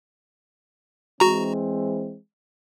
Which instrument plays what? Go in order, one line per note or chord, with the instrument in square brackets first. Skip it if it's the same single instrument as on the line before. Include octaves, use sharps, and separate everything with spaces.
[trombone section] E3 G#3 C4 [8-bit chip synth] F#4 A#5